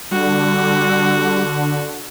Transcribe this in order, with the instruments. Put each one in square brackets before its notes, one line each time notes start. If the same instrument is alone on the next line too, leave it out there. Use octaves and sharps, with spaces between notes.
[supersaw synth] D3 [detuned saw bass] G3 [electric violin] F#4